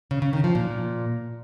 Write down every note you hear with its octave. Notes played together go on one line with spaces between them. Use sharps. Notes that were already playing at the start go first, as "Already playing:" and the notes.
C#3
C#3
D#3
F3
A#2